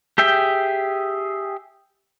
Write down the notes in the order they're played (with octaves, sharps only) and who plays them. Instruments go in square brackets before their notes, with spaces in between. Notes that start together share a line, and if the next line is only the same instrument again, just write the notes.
[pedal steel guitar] G4 G#4 E5 G5